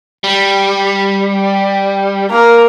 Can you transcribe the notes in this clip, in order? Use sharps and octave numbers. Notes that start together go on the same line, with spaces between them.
G3
A#3 A#4